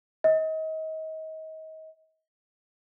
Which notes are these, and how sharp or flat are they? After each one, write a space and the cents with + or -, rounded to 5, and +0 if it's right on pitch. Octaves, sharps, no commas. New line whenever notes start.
D#5 +30